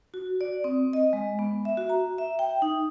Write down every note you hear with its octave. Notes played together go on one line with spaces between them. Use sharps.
F#4
D5
C4
D#5
G#3
B3
E5
F#4
A#5
E5
G5
D#4